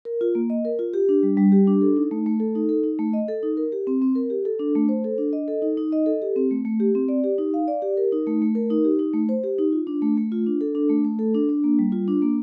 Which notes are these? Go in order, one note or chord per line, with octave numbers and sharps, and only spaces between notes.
A#4
F4
A#3
D#5
A#4
F4
G4
D4
G3
G3
G4
D4
A4
D#4
A3
A3
A4
D#4
A4
D#4
A3
D#5
A4
D#4
A#4
G4
C4
C4
A#4
G4
A4
D4
A3
C5
A4
D4
D#5
A4
D#4
D#4
D#5
A4
G4
C4
A3
A3
G4
C4
D5
G4
D#4
F5
D5
G4
A#4
D#4
A3
A3
A#4
D#4
G4
D#4
A3
C5
G4
D#4
F4
D4
A3
A3
F4
D4
A4
D4
A3
A3
A4
D4
D4
A#3
G3
F4
D4
A#3